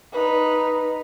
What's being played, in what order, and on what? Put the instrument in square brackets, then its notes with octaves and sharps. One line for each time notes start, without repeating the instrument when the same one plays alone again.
[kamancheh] D#4 B4